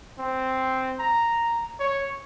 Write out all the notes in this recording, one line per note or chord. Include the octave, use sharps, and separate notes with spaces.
C4
A#5
C#5